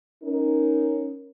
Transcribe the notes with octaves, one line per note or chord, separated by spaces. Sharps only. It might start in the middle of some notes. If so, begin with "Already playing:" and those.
C#4 D#4 A#4